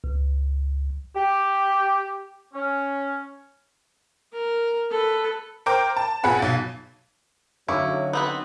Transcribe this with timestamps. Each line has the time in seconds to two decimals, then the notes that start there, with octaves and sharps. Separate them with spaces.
0.04 C#2
1.15 G4
2.54 C#4
4.33 A#4
4.91 A4 B4
5.66 A#4 C5 G5 D6
5.97 A5
6.23 A#1 B3 G#4 F#5 B5
6.39 B1 A6
7.68 D3 F#3 C#4 D#4 E4 F5 C#6 D6
8.13 B3 C4 B4